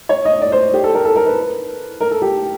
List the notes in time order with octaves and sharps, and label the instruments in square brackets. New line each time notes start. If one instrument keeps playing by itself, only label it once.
[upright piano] C#5
D#5
D5
C5
G4
A4
A#4
A4
A#4
B4
A#4
A4
G4